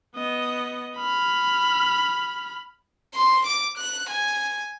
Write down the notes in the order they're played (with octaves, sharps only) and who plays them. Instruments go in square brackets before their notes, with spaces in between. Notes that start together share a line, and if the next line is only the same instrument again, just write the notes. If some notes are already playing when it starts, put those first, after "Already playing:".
[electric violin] B3 D#5
B5 F6
[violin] C6
D6
F#6
G#5